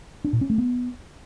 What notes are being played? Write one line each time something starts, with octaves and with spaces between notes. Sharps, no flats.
D4
A#2
C#4
A3
B3